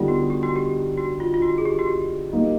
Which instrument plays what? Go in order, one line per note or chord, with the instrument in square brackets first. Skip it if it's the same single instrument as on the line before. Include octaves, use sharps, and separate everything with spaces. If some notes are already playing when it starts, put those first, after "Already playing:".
Already playing: [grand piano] D3 G3 B3 D#4 [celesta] F4 G4
[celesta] F#4
G4
F#4
G4
F#4
F4
F4
F#4
G#4
G4
F#4
G4
[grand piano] G3 A#3 D#4